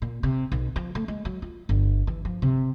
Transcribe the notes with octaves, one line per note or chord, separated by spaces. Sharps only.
A#2
C3
B1
F3
A3
G#3
F#3
F4
G1
E3
F3
C3